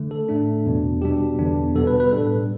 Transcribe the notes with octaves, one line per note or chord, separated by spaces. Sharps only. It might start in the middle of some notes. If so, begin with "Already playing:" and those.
Already playing: D3 A3
A4
A2 A3 D4
E2 B2 B3 D4
B2 G3 D4 G4
E2 D3 B3 D4
B2 G3 B3 A4
B4
B4
A2 G3 D4 A4